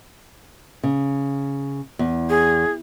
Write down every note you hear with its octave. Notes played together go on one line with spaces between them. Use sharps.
C#3
E2
G#4